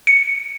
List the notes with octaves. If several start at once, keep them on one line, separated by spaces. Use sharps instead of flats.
C#7